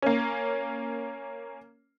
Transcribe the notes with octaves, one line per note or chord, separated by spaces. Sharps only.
A#3 C#4